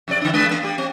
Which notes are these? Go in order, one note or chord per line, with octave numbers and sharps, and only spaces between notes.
F2 C3 D5
D3 D4
G#3 B4
A3 B3
G3 G4
C4